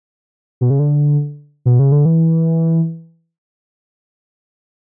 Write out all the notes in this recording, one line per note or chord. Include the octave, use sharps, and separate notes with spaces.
B2
C#3
D3
B2
C#3
D3
E3